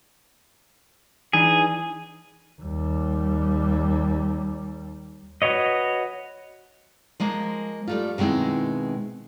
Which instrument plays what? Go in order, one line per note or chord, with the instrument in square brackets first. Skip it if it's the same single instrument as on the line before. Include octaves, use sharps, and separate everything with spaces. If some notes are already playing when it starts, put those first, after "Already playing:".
[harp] E3 D4 D#4 [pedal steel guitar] G#4
[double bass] D#2 G3
[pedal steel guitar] F#4 B4 C#5 D#5
[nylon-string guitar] F3 G#3 A#3
G3 A3 F4
B2 D#3 G#3 C4 E4